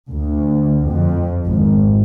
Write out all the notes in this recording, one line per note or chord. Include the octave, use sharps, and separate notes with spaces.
D2
F2
G#1